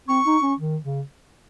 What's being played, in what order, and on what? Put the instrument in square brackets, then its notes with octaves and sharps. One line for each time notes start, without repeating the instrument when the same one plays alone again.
[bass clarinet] C4 [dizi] C#6
[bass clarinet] D#4
C#4
D#3
C#3